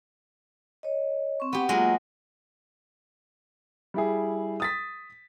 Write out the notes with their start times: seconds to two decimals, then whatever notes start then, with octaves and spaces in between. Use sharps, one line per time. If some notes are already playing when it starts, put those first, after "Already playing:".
0.83 C#5 D#5
1.40 C4 C#6
1.53 B3 G4
1.69 F#3 G#3 A#3 F4 G#4 D#5
3.94 G3 E4 G#4
4.60 D#6 A6 B6